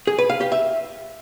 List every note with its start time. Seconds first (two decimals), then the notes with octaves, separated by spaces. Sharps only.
0.07 G#4
0.19 B4
0.30 F5
0.41 G4
0.52 E5